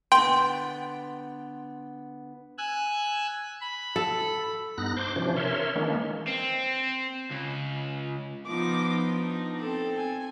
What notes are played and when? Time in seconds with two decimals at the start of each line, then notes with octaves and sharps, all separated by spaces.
0.12 D3 B3 G5 C6 D7
2.58 G#5 E6 F#6
3.61 B5
3.96 A4
4.78 G2 B3 D#4 F#6 A#6
4.97 C5 C6 D6
5.16 C3 E3 F3 C#4 D4
5.37 A#4 C#5 E5 C6
5.76 D#3 E3 G#3 A#3 C#4 D4
6.27 C4
7.31 C#2
8.46 F3 B3 D#4 F4 D6
9.09 D4 D#4
9.60 C4 A4
9.97 G#5